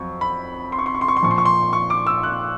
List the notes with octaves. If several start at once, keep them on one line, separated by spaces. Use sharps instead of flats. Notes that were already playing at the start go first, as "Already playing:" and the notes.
Already playing: F2 F#3 C#6
B5
C6
C#6
C6
C#6
C6
C#6
C6
A#2 F3 C#6
C6
C#6
C6
C#6
D6
E6
F#6